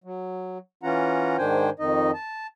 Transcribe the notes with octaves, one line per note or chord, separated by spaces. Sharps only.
F#3
E3 C#4 F4 F#5 A#5
G#2 D#3 D4 C5 G5 G#5
F2 D#3 D#4 D#5
A5